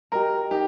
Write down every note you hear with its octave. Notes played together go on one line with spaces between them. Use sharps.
G4 A#4 D#5 A#5
D#4 G4